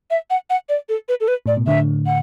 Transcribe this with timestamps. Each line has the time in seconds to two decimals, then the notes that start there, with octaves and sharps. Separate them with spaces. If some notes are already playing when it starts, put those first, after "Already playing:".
0.11 E5
0.30 F#5
0.50 F#5
0.69 D5
0.89 A4
1.09 B4
1.21 A4
1.28 B4
1.46 A2 D5
1.57 B2
1.67 A2 D3 E5
2.07 F#5